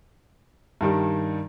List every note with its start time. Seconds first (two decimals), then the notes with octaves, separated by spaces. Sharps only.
0.81 G2 D#3 G3